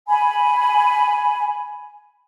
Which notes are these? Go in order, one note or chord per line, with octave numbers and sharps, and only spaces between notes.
G#5 B5